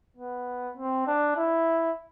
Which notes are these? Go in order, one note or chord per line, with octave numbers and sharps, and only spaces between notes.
B3
C4
D4
E4